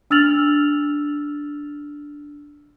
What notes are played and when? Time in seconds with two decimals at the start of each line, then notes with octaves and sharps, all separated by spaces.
0.10 D4 E6 F6 A6 F7 F#7